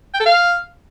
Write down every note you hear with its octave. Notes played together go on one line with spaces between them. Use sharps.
G5
A4
F5